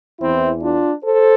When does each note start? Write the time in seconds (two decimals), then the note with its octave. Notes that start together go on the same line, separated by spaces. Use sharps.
0.20 E2 E3 C4 E4
0.62 D4 F4
1.05 A4 C5